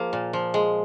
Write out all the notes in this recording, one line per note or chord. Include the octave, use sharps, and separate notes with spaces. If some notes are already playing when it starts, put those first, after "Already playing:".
Already playing: F3 A#3 G#4
A#2
F3
G#3